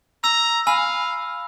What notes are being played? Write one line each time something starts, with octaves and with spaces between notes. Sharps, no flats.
A#5 E6
F5 G#5 B5 E6